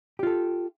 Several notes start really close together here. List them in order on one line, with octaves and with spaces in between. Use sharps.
G4 F4 A4